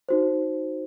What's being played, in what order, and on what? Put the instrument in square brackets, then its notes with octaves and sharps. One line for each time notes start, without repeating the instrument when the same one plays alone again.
[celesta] D#4 F#4 C5